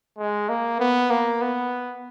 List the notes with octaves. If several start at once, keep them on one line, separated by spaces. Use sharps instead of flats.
G#3
A#3
B3
A#3
B3